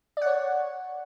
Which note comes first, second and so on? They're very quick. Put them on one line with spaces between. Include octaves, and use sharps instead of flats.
D5 F#5 C#5